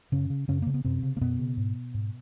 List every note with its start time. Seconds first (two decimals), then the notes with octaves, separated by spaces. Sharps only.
0.12 F#2 C#3 C#4
0.30 C#3
0.48 F#2 C#3 C#4
0.62 C#3 A#3
0.74 B3
0.85 F#2 C3 C4
1.03 C#3
1.17 A#3
1.21 F#2 B2 B3
1.39 C#3
1.57 G#2
1.94 G#2